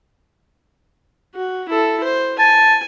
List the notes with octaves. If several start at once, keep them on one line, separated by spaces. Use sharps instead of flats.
F#4
E4 A4
C5
G#5 A5